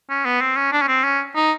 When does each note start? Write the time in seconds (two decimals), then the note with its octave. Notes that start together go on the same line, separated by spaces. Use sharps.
0.10 C#4
0.25 B3
0.41 C4
0.56 C#4
0.72 D4
0.81 C#4
0.88 C4
1.03 C#4
1.36 D#4